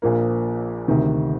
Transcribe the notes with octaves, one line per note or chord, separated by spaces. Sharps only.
A#1 A#2 F3 A#3
D2 C3 D#3